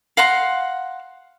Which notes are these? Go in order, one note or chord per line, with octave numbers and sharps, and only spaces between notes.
F5 F#5 A#5 C6